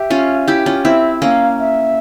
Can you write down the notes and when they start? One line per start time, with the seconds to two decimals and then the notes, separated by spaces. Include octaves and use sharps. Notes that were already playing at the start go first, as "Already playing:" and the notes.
Already playing: G4 E5
0.10 C#4 F4
0.48 E4 G4
0.66 C#4 F4
0.84 C4 E4 E5
1.22 A#3 C#4 F5
1.59 E5